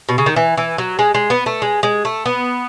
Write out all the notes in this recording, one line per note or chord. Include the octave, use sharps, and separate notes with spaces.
B2
C#3
D#3
E3
E3
F#3
G#3
G#3
B3
A3
G#3
G#3
A3
B3